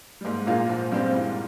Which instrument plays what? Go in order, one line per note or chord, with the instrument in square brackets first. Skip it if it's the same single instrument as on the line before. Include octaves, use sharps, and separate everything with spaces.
[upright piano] G3
[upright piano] G#2 G#3 [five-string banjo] A#3
[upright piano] A#2 A#3 [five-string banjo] F4 G#4
[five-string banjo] F3
[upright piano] G2 G3 [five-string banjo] C4 G4 C5
[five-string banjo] E3